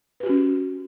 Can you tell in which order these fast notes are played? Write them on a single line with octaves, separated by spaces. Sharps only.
B4 G4 F#4 C#4